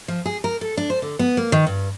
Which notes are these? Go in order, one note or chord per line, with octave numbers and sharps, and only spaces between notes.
F3
G#4
A#4
A4
D4
C5
D3
B3
A#3
D#3
G2